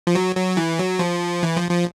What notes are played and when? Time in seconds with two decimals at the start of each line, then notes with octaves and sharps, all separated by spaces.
0.07 F3
0.15 F#3
0.36 F#3
0.57 E3
0.79 F#3
0.99 F3
1.43 E3
1.57 F3
1.71 F3